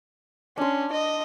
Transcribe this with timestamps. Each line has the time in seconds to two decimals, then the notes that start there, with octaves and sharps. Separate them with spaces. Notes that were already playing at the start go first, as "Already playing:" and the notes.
0.57 C#4 D4 C6
0.93 D#5